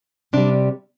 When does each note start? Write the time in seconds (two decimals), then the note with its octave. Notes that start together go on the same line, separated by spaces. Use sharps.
0.33 C3 G3 D4